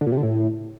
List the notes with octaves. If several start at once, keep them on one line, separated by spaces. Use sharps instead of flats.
D3
A#2
C3
D3
A2